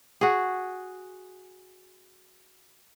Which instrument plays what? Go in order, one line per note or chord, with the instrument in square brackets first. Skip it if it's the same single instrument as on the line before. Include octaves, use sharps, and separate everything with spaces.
[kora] F#4 G#4